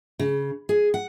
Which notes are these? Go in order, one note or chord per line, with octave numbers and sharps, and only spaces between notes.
C#3
G#4
F#5